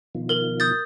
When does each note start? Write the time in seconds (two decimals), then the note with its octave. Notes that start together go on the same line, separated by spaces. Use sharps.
0.15 B2 D#3 F3
0.29 A#4 F#7
0.60 D#6 G6 A6